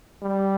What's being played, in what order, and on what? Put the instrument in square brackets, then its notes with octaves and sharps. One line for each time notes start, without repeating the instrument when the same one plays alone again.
[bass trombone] G3